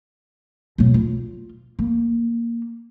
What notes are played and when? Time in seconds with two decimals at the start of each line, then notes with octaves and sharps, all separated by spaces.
0.78 B2 F#3
0.94 F4
1.79 A#3